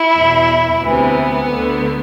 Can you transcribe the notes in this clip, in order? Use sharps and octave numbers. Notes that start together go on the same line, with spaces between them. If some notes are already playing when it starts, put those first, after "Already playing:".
Already playing: E4
E2 B2
D2 C3 E3 B3
D2 D3